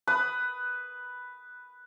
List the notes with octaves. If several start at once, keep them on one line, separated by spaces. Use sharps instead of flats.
B4 D#6